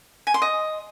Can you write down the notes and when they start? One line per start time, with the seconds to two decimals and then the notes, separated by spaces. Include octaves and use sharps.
0.27 G#5
0.34 C6
0.42 D#5